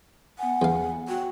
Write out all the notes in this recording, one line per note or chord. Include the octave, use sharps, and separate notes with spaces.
B3 F#5 G#5
E2 F5
F#4 G5